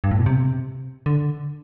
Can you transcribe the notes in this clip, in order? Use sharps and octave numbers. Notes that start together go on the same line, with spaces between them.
G2
A2
B2
C3
D3